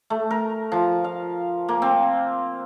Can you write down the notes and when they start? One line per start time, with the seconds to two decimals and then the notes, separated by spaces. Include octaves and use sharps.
0.10 A3
0.31 A#4
0.72 F3
1.04 F5
1.69 A#3
1.82 C4